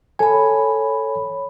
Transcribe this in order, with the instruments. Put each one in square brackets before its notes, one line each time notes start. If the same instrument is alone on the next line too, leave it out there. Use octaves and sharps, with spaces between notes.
[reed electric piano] A4 G#5 [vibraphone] C#5 B5